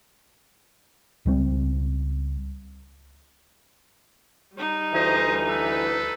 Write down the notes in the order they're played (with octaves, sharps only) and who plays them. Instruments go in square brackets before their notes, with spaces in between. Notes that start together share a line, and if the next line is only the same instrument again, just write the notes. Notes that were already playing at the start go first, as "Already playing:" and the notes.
[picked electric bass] C#2 G3 C4
[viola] G3 D#4
[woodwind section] D2 E3 [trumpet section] C5 D#5
[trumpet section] A4 B4